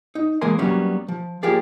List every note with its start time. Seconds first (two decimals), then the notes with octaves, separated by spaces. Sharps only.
0.15 D#4
0.41 E3 G#3 A#3 A#4 G#5 C6
0.58 F#3 G3 A#3 B3 C#4
1.08 F3
1.43 F3 A#3 G4 G#4 D5